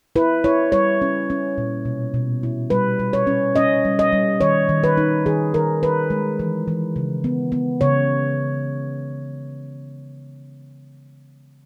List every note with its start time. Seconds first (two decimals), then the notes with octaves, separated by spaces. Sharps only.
0.16 E4 B4
0.44 E4 C#5
0.72 G3 C#5
1.02 C#4
1.30 C#4
1.58 A#2
1.85 B2
2.14 B2
2.43 E4
2.70 G3 B4
3.00 G3
3.13 C#5
3.27 C#4
3.56 C#4 D#5
3.85 G3
3.99 D#5
4.12 G3
4.41 D#3 C#5
4.69 D#3
4.84 B4
4.97 D#4
5.26 D#3 G#4
5.54 D#3 A#4
5.83 D#3 B4
6.10 G#3
6.40 E3
6.68 E3
6.96 C#3
7.24 B3
7.52 B3
7.81 C#3 C#5